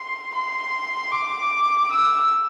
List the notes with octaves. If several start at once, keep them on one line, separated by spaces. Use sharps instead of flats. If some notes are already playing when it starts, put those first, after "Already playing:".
Already playing: C6
C6
D6
E6